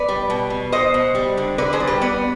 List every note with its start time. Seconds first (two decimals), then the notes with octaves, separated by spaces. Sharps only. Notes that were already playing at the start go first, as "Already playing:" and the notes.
Already playing: B3 B4 D5
0.08 G3
0.30 B2
0.50 B2
0.72 B2 C5 D#5
0.94 B2
1.15 G3
1.37 D3
1.58 D3 B4 D5
1.73 G#4 C5
1.80 G3
1.87 G4 B4
2.01 B3 B4 D5